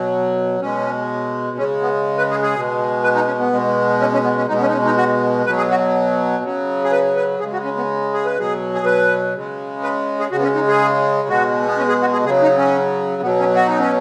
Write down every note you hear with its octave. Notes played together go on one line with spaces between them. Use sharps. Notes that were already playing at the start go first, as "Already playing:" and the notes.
Already playing: B2 F#3
B2 G#3 C#4
C#3 G#3 C#4
B3
B4
G#4
G#4
B2 G#3
B4
D#4
C#4
B3
B2 G#3
C#4
C#4
B3
C#4
B2 G#3 D#4
B3
C#4
D#4
C#4
D#4
F#4
B2 F#3 B4
G#4
F#4
C#3 F#3
G#4
B4
B4
C#3 G#3 G#4
F#4
C#4
B3
G#4
B4
B2 F#3 G#4
G#4
B4
C#3 G#3
B4
G#4
C#3 G#3 F#4
B3
C#4
D#4
G#4
B2 G#3 F#4
B3
C#4
G#4
F#4
G#4
C#3 F#3 G#4
D#4
C#4
B2 F#3 B3
C#4
F#4
D#4
C#4